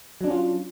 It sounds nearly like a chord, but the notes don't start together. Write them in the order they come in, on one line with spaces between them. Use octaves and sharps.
F#3 D4 C#4 F4